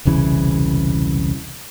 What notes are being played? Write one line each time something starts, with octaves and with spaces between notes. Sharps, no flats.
E1 C2 C#3 E3